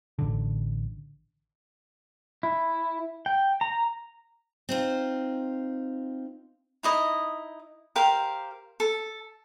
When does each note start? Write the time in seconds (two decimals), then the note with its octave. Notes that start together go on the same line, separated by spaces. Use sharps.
0.19 A1 D3
2.43 E4
3.26 G5
3.61 A#5
4.69 C4 D#4 F4
6.83 D#4 E4 D#5
7.96 G4 A#4 C5 F5
8.80 A4